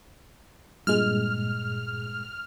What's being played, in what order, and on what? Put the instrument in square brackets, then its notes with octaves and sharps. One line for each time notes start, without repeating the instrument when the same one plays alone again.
[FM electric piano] G2 A#2 G#3 [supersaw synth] F6